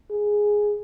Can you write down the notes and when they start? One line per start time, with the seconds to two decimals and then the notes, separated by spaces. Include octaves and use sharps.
0.11 G#4